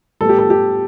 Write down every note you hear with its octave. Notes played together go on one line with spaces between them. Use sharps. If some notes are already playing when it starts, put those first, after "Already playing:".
A2 G3 B3 A4
G4
A4
G4